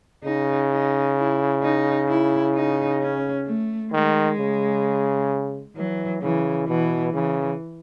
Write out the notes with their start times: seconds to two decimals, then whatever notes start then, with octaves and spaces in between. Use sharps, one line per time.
0.24 C#3 D#4
0.71 D#4
1.16 E4
1.63 D#4
2.08 E4
2.55 D#4
3.00 C#4
3.46 A3
3.92 D#3 G#3
4.38 C#3
5.76 E3 F#3
6.22 C#3 E3
6.68 B2 E3
7.13 C#3 E3